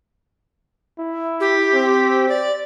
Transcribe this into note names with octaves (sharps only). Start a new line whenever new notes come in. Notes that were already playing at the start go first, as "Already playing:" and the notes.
E4
G4
C4
D5